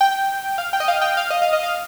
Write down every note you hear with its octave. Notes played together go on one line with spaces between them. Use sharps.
G5
F5
G5
D#5
F5
G5
F5
D#5
F5
D#5
F5